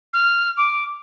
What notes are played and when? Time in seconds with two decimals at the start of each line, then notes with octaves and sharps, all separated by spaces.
0.13 F6
0.57 D6